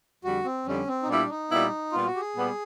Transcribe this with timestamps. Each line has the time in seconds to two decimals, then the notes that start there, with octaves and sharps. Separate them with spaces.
0.24 F2 D3 G3 F#4
0.45 C4
0.66 F2 D3 G3 C#4
0.87 C4
1.03 D#4
1.08 A#2 G3 B3 D4 E4
1.29 D#4
1.50 A#2 G3 B3 E4
1.92 A#2 G3 B3 F4
2.06 F#4
2.16 G4
2.20 G#4
2.34 A#2 G3 B3